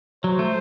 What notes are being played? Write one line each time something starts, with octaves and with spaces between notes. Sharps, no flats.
F#3 C5
A3